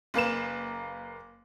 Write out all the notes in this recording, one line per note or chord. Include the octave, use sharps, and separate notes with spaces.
F#1 A#3 B4 E7